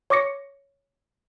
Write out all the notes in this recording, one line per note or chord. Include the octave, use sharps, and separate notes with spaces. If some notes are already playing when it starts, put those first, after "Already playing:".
C#5 C#6 D6 A#6 C#7